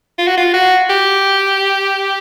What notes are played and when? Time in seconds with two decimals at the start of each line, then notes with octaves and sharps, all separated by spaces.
0.18 F4
0.27 F#4
0.37 F4
0.54 F#4
0.90 G4